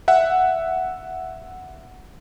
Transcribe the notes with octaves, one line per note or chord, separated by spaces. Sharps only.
E5 F#5